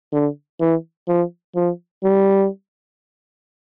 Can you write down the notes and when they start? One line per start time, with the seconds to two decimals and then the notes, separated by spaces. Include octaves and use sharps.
0.13 D3
0.60 E3
1.08 F3
1.55 F3
2.04 G3